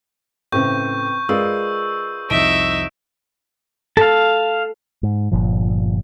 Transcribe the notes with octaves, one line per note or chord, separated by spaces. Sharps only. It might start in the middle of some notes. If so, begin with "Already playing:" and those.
A2 C#3 C4 B4 C5 C#6 G6
G#3 F4 G#4 A#4 B4 D5 E6
C2 F2 D#4 E5 D7
A4 F5 A5
G#2
G1 A#2 F3